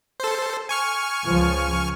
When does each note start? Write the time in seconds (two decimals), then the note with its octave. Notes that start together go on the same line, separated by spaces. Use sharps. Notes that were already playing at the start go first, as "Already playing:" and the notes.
0.20 A4 C5
0.69 G#5 C#6 F6
1.26 C#2 F3